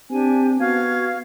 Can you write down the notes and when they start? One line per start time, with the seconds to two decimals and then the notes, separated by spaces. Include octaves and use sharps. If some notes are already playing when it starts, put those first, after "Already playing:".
0.10 C4 D4 G4 G#5
0.60 B3 F#4 F5 G#6